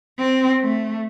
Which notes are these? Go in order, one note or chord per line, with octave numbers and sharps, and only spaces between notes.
C4
A3